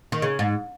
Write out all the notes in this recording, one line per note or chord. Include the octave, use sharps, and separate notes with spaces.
D#3
C#3
G#2